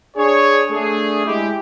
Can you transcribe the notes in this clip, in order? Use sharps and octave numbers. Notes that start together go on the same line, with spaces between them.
D4 G#4 C#5
A3 D4 G#4
G#3 E4 G4